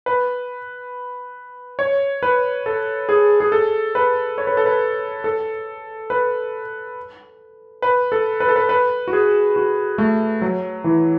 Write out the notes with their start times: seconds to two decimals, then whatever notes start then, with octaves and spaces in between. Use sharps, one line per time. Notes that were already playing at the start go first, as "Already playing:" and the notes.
0.06 B4
1.79 C#5
2.23 B4
2.66 A4
3.09 G#4
3.40 G#4
3.52 A4
3.95 B4
4.38 C#5
4.47 B4
4.57 A4
4.66 B4
5.24 A4
6.10 B4
7.82 B4
8.12 A4
8.40 B4
8.48 A4
8.56 B4
8.69 B4
9.08 F#4
9.13 G#4
9.56 F#4
9.98 A3
10.42 F#3
10.84 E3